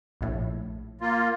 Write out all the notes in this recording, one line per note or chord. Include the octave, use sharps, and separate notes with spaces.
A#1 A2
A#3 F4